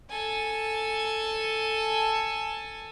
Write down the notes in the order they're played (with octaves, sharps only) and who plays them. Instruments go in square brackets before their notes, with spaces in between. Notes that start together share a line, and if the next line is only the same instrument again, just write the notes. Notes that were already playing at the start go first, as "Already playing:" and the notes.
[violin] A4 G#5